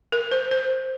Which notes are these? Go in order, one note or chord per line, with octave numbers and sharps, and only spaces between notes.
A#4
C5
C5